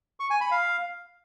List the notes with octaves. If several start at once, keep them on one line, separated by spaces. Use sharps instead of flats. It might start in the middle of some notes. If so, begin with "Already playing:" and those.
C#6
G#5
B5
F5